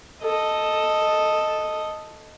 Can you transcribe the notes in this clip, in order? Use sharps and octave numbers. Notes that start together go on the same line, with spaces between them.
A4 D#5